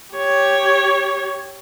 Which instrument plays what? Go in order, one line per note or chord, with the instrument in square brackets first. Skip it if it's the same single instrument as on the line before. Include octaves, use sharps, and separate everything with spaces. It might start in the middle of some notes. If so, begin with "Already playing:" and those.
[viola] G4 C#5